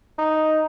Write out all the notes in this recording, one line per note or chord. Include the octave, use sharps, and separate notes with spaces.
D#4